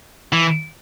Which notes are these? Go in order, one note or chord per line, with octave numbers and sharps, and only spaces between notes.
E3